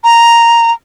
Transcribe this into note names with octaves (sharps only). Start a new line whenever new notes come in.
A#5